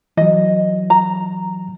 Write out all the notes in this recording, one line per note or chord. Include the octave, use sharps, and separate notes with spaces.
E3 F#3 D#5
A#5